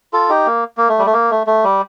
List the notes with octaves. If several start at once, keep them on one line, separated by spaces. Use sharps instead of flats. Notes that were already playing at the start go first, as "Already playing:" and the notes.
F4 A4
D#4 G4
A#3
A#3
A3
G3
A3
A#3
A3
A3
G3